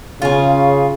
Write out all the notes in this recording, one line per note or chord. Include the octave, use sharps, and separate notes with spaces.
C#3 F4 G#4